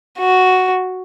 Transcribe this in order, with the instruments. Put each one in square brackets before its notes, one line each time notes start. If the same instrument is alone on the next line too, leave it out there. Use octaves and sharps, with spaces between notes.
[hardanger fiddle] F#4